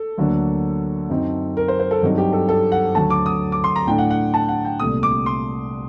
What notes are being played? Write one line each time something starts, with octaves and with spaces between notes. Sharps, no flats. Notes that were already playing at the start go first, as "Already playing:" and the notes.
Already playing: A4
D2 D3 F#3 A#3 D4
F#2 F#3 C4 D#4
A#4
C5
C5
A4
G2 F#3 C4 D#4
G4
A4
A4
F#5
D2 D3 F#3 A3 A5
D6
D#6
D6
C6
A#5
A2 A3 D4 G5
F#5
F#5
A5
F#5
G5
C2 A#2 A3 D#6
D6
C6